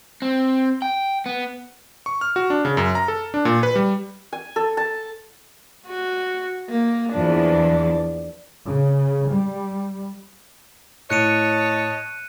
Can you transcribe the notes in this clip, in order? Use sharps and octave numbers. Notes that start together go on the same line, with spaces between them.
C4
G5
B3
C#6
F6
F#4
D4
C#3
F#2
A#5
A4
D4
A#2
B4
G3
G#5
A4
A5
F#4
A#3
E2 F3 D4
C#3
G3
A2 C#5 D#5 A5 F#6 C#7 D#7